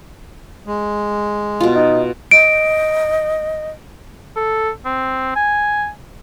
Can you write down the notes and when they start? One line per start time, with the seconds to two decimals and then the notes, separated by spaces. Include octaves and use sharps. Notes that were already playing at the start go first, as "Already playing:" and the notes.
0.67 G#3
1.60 B2 F4
1.75 D#4
2.31 D#5 D7
4.36 A4
4.85 C4
5.36 G#5